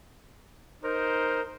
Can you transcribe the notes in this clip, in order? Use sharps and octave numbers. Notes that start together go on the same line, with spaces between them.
D#4 A#4 C5